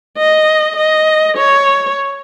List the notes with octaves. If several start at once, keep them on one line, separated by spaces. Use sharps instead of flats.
D#5
D#5
C#5